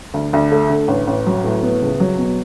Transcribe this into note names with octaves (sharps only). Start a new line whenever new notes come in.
D2
D2
A3
D3
A1
A1
F#3
A2
B3
C#2
F#3
B2